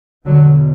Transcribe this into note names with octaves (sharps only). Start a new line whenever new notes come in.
E2 B2 D3 F#3